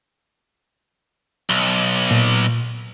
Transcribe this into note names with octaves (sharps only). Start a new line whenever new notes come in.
B1
A#2